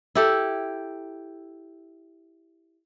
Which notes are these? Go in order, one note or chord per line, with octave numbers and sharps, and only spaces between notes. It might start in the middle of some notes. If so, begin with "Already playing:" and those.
E4 G4 A4